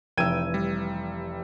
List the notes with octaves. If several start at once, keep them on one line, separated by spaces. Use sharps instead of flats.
F1 E3 G5 E6 G#6 D#7
G3